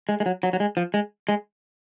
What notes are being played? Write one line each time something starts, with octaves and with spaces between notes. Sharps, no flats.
G#3
G#3
F#3
F#3
F#3
G#3
F3
G#3
G#3